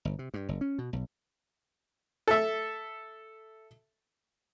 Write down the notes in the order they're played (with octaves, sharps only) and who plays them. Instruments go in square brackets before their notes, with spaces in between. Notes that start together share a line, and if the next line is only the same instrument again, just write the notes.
[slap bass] G1
C3
G2
F#1
C#4
B2
B1
[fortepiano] A4 E5